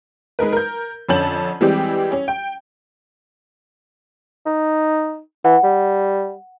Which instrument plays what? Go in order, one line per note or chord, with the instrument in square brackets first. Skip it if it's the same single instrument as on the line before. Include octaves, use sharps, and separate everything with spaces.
[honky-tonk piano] G#3 D#4 A#4 B4
A#4 G6
F2 D3 C#4 A5 G6 F#7
E3 G3 G#3 C4 G4
C#4
G5
[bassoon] D#4
[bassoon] E3 [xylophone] F#5
[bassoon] G3